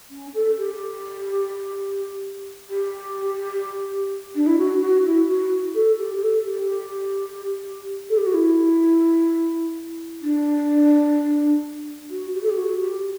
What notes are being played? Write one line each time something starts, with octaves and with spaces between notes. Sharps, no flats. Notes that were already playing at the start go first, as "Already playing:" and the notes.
C#4
A4
G4
G4
D4
E4
F#4
F#4
E4
F#4
A4
G4
G4
A4
G4
A4
G4
F#4
E4
D4
F#4
G4
A4
G4
F#4
G4